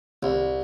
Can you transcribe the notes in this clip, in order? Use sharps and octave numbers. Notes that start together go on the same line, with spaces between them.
C2